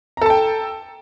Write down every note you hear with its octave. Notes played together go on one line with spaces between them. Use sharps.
A4 G5 A5 A#5